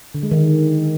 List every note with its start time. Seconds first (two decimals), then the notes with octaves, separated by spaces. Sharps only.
0.14 D3
0.23 G#3
0.31 D#3